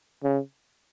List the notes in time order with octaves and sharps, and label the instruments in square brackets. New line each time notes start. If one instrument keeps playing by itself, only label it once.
[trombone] C#3